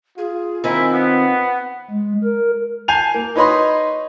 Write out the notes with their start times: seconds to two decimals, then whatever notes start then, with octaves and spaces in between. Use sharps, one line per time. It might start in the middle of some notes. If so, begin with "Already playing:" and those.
0.18 F4 G#4
0.64 D#3 C4 D#4 E4 G#5
0.93 B3 F#5
1.91 G#3
2.24 A#4
2.88 G#5 A5 G6 C7 D#7 F7
3.14 A#3
3.36 D#4 B4 C#5 D#5 B5 C6